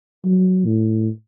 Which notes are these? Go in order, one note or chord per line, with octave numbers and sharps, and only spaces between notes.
F#3
A2